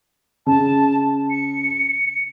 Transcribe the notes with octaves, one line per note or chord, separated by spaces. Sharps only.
C#3 A5
C#7